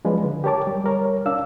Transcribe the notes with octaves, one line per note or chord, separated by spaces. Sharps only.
F3 G#3 C#4 D4 F4 B4
D3
G4 A#4 C#5 A5 D6
G3
G3 A#4 C#5
C#4 D4 D5 F5 E6